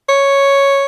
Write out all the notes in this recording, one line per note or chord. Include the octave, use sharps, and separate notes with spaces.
C#5